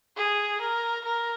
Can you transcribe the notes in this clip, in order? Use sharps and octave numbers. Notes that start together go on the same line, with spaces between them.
G#4
A#4
A#4